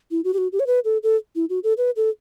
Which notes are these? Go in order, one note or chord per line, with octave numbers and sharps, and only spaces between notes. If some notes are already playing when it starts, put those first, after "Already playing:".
E4
F#4
G4
F#4
G4
C#5
B4
A4
A4
E4
F#4
A4
B4
A4